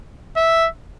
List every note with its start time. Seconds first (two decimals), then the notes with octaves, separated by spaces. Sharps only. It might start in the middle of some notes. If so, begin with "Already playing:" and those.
0.37 E5